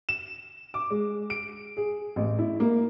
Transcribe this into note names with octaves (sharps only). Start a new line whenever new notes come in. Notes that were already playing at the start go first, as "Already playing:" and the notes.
E7
D6
G#3
D7
G#4
A1
E4
A#3